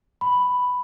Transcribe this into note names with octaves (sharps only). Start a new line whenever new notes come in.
B5